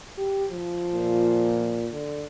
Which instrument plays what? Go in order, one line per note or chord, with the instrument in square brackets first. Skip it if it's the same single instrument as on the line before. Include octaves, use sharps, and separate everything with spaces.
[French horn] G4
F3
[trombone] A#2
[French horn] D3